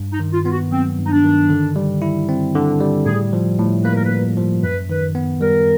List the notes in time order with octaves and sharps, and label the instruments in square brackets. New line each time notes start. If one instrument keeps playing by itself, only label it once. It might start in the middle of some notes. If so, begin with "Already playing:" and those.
Already playing: [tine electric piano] G2
[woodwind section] D#4
[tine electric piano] D#3
[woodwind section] F4
[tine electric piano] B3 [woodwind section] F4
[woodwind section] F#4
[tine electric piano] F#3 [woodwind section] C4
[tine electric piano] G2
[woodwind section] D#4
D4
[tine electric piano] D#3
D3
G3
E4
C4
D3
G3
[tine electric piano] A2 [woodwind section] G#4
[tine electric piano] F3
A2
[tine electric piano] A#3 [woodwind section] B4
[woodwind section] A#4
B4
[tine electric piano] A2
F3
[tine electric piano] F#2 [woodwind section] B4
[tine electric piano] D#3 [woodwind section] B4
[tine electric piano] B3
[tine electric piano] G3 [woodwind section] A#4